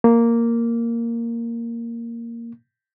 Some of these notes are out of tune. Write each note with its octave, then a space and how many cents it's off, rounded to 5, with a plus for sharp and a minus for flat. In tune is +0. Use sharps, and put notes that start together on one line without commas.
A#3 -5